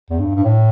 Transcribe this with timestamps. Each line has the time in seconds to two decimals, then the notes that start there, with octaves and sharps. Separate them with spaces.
0.10 E2
0.19 G2
0.35 G2
0.44 A2